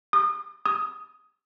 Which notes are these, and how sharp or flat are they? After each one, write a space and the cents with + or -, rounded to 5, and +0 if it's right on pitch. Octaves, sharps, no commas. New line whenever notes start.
D#6 -35
D#6 +5